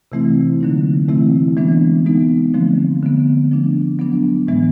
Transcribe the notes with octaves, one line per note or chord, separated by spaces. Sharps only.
C3 E3 A3 C4 E4
D3 F#3 A#3 D#4
C3 E3 A3 C4 E4
E3 G#3 B3 D4
E3 G#3 B3 D#4
D3 F3 A3 C4
D3 F3 G#3 B3
F3 A3 D4
F#3 B3 D4
A2 E3 G#3 B3 D4